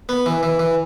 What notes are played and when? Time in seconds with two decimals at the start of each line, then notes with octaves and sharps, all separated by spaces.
0.09 B3
0.26 E3
0.43 E3
0.59 E3